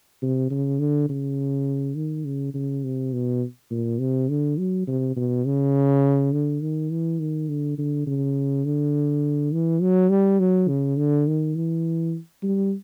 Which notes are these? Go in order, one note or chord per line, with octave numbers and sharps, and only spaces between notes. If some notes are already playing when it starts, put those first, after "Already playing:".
C3
C#3
D3
C#3
D#3
C#3
C#3
C3
B2
A#2
C3
D3
F#3
C3
B2
C#3
D3
D#3
E3
D#3
D3
D3
C#3
D3
E3
F#3
G3
F#3
C#3
D3
D#3
E3
G3